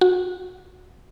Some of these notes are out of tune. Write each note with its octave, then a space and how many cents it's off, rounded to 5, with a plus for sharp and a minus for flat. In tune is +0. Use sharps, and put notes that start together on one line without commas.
F#4 -25